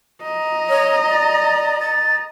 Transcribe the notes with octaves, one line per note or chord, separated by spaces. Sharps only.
D#5 A#5
C#5
D5
A6